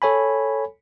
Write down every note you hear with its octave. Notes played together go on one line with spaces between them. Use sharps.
A4 C#5 G#5 B5